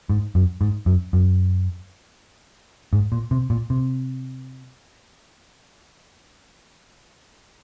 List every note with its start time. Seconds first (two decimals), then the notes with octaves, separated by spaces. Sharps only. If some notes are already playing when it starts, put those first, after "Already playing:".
0.09 G#2
0.35 F#2
0.61 G#2
0.86 F#2
1.13 F#2
2.93 G#2
3.12 A#2
3.31 C3
3.50 A#2
3.70 C3